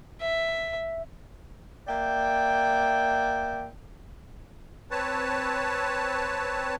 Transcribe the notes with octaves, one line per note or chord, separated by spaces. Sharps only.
E5
A#3 D5 E5 G5
C4 B4 C#5 A5